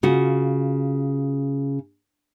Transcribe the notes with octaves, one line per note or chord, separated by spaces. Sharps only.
C#3 F4 F#4